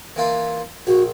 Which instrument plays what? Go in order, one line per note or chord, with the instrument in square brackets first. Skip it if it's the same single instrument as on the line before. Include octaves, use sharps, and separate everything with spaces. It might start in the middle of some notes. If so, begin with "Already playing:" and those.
[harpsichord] E3 A#3 F4
[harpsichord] A#1 [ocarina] F#4